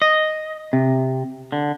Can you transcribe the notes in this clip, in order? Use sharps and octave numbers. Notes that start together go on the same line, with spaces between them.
D#5
C3
D3